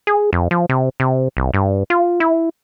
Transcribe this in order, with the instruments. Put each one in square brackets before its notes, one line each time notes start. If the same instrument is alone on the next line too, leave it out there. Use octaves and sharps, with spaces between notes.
[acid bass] G#4
F2
F3
C3
C3
C2
G2
F4
E4